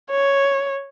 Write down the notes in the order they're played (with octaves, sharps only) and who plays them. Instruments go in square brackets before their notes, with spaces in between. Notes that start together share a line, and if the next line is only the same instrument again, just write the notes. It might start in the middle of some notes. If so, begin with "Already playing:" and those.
[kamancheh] C#5